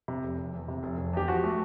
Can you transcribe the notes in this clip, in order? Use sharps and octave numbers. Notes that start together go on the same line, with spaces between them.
C3
F1
F1
E2
C3
F1
F1
E2 G4
F3 F#4
A3